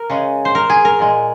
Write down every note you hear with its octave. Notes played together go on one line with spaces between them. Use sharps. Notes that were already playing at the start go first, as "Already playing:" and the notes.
Already playing: A#4
C#3 G#3
C5
A#4
G#4
A#4
A#2 G#3